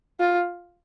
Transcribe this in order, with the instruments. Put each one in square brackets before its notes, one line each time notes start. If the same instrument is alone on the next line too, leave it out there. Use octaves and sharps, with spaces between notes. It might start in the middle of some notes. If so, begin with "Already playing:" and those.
[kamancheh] F4